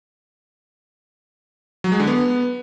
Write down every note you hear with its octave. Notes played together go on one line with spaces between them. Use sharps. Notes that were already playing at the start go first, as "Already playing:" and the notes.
F#3
G#3
D3
B3